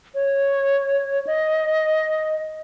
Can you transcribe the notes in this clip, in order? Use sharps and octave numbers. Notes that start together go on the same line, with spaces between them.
C#5
D#5